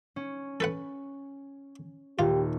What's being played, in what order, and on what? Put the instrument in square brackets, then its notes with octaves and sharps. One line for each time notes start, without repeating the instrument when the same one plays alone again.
[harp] C#4
[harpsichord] A4 B4 F#5
[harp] D#1 [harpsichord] F4 [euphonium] G4